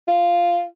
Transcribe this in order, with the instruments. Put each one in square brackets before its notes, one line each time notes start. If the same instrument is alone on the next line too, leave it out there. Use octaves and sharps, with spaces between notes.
[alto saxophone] F4